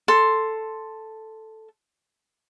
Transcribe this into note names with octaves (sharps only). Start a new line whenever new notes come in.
A4 C6